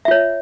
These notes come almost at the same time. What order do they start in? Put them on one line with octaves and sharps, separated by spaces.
E5 F4 C#5